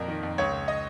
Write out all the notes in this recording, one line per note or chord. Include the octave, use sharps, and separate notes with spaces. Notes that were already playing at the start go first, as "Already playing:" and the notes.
Already playing: F2 A#2 A#3 A#4
D#3
F2
C#2 C#5
C#2
D#5